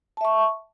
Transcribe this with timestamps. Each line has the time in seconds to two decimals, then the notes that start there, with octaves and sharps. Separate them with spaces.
0.17 A5
0.21 E5
0.25 C#6